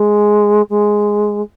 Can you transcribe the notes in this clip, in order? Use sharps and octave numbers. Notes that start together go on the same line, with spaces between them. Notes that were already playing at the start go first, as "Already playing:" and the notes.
Already playing: G#3
G#3